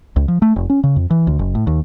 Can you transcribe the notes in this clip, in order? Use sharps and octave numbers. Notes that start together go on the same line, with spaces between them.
C#2
F3
A3
F1
C#4
C#3
F2
E3
D2
F#1
A2
D#2